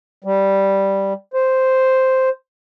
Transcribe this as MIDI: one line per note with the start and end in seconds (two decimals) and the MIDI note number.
0.24 1.13 55
1.34 2.29 72